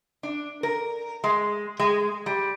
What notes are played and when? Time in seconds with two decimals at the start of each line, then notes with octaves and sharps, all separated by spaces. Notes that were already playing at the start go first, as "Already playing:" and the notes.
0.23 D4
0.63 A#4
1.24 G#3
1.79 G#3
2.26 G3